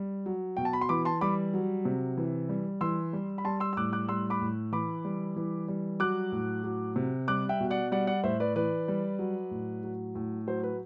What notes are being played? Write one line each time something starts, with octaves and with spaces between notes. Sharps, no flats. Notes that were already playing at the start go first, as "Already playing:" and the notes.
Already playing: G3
F#3
B2 G5
A5
B5
C6
E3 B5 D6
A5 C6
G3 B5 D6
F#3
C3
E3
G3
E3 C6 E6
G3
B5
G3 A5 C6
C6 E6
E6
A2 D6 F#6
D6 F#6
G3 C6 E6
B5 D6
A2
E3 B5 D6
G3
E3
G3
F#3 D6 F#6
A2
F#3
C3
G3 D6 F#6
E5 G5
B2
D5 F#5
G3 D5 F#5
D5 F#5
A2 C5 E5
B4 D5
E3 B4 D5
G3
F#3
A2
F#3
A2
F#3 C5
B4